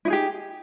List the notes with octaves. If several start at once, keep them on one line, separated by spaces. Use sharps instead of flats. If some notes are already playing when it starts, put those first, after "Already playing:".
D#4 E4 G4 G#4